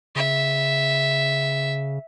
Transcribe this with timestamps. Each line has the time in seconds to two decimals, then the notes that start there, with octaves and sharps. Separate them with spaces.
0.16 C#3 E5